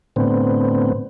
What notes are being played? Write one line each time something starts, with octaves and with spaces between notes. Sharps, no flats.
A2 D3 B3 C4